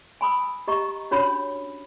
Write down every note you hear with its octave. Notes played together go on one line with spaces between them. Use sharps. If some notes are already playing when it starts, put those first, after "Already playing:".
G#5 B5 D#6 E6
G4 D#5 A#5 C#6
C#4 D4 F#4 C#5 B5